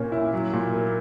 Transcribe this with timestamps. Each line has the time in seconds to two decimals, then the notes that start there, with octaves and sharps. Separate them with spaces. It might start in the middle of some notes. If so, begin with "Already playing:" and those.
Already playing: A#2 A#3 C#4
0.12 E4
0.33 F#3
0.53 A#2
0.74 A#3